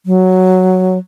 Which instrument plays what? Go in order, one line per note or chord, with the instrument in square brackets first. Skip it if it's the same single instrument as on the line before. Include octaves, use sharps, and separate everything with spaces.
[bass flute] F#3